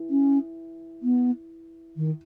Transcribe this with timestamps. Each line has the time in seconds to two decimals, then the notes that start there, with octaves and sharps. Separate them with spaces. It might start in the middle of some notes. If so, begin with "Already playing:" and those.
Already playing: E3
0.10 C#4
1.03 B3
1.97 D#3